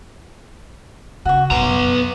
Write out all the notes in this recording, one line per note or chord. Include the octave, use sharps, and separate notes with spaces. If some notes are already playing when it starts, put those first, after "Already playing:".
C#3 F#4 C#6
F#2 B2 B3 A#5 C6 C#6